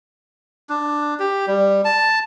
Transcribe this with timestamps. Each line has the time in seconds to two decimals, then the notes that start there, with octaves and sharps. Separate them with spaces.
0.69 D4
1.20 G4
1.47 G3
1.85 A5